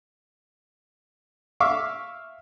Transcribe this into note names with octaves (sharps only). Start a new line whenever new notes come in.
E5 F5 C#6 D6